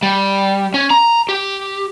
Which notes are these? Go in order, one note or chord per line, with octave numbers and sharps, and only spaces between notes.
G3
C#4
A#5
G4